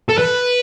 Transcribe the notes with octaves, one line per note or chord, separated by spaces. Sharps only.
A4
B4